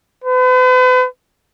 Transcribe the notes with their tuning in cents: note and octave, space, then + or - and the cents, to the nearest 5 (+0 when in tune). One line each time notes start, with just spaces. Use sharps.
B4 +45